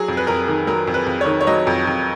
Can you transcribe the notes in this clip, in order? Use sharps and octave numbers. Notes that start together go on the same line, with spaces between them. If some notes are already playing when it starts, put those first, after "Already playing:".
Already playing: F#3 G#4
F2
B4
F2 A#4
D#3
F#3 A#4
F2
B4
F2
C#5
D#3
C#5
F#3 D#5
F2
F2